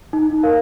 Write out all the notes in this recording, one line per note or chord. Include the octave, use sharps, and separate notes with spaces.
D#4
A#4 F5